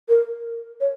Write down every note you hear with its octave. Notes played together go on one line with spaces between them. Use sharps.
A#4
C#5